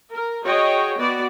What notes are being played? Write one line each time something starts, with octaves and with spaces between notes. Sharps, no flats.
A#4
F#4 G#4 C#5 D#5 G5
B3 F#4 D5